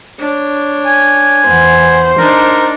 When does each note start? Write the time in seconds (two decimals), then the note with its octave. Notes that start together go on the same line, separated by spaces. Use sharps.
0.19 D4 C#5
0.86 G#5
1.47 E2 E3 C5 F#5
2.18 D4 D#4 A#4 D5